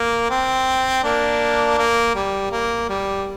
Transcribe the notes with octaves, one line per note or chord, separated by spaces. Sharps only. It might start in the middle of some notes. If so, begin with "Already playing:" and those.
Already playing: A#3
C4
A#3 D4
A#3
G3
A#3
G3